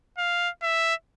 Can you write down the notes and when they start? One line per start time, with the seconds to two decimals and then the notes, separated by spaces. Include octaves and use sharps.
0.18 F5
0.63 E5